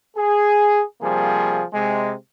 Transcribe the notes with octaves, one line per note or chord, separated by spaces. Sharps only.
G#4
C3 F3 G3 A#3 G#4
C3 G#3